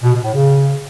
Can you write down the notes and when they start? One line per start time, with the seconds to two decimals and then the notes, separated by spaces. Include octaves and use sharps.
0.03 B2
0.13 B2
0.24 A2
0.34 C#3